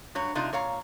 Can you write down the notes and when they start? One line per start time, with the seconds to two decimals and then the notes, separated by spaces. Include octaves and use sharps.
0.15 G2 F#3 C#5
0.35 C3 G#3 D4 D#4 F4
0.53 A#2 C#5 F5 A#5